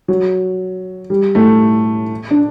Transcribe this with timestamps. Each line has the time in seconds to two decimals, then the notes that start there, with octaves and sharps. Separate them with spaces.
0.08 F#3
1.10 G3
1.35 A2 A3
2.31 D4